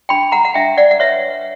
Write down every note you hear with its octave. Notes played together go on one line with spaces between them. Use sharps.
D4 G5 B5
F#5 A#5
F#5
D4 E5 G5
D5 F#5
F#5
B4 C#5 E5